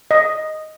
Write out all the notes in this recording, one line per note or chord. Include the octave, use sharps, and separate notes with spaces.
D#5